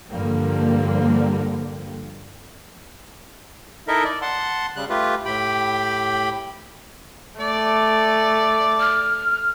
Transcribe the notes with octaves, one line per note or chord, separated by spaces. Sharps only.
G2 D3 F3 G3 A#3
D#4 E4 A4 A#4 D#5 E5
D5
F#5 A5 C6
C#3 G3 F#6
A3 F4 G4 B4
A2 G4 G5 B5
A3 D5 D6
F6